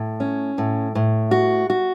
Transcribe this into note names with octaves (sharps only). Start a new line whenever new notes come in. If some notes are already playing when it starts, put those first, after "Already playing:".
Already playing: A2
C#4
A2
A2
F#4
F#4